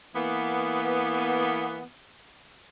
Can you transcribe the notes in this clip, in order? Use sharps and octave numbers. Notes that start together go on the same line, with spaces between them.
E3 A#3 B3